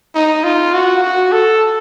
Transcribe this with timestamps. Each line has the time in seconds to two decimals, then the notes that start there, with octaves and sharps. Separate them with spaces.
0.15 D#4
0.44 F4
0.73 F#4
1.02 F#4
1.32 A4